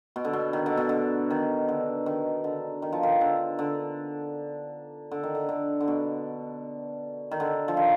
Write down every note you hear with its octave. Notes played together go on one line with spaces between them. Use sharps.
B2
D3
B2
D#3
D3
B2
D3
D#3
D3
D#3
D3
D#3
F3
D#3
D3
D3
D3
D#3
D3
D3
D3
B2
D#3
D3
F3
D#3